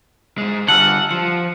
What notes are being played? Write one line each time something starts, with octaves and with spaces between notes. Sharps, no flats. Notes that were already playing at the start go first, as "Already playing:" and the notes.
G#2 G#3
D3 G3 F#5 A5 E6 F6
F3 C#7